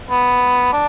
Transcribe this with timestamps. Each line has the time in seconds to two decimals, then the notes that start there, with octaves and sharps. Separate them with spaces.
0.10 B3
0.73 D4